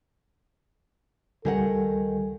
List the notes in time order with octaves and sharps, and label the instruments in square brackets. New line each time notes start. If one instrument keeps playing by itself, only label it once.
[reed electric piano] C#2 G3 G#5 [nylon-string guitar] D#3 A#4 F#5 [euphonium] A4